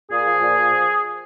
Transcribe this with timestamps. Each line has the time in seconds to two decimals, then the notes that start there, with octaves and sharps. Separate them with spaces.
0.11 A#2 G#4
0.26 F3
0.41 A#2
0.57 F3